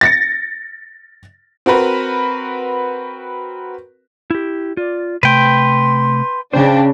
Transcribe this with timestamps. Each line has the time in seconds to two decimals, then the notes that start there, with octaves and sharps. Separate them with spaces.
0.01 A6 A#6 C#7
1.66 C4 F#4 A#4 B4
4.31 E4 G4
4.77 F4 D5
5.23 C3 A3 B4 G5 C6
6.53 C#3 D4 C5 G5